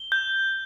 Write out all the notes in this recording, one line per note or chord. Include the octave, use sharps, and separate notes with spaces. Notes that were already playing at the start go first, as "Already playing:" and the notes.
Already playing: G7
G6